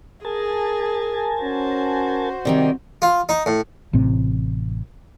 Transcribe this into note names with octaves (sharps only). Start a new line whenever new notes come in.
G#4 A#4 G#5 A5
C#4 F#4 C5
C3 D#3 F#3 G3 D#4 D5
F4
D#4
A2
A1 A2 C3 C4